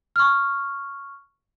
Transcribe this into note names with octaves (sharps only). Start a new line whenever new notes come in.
C#6 F6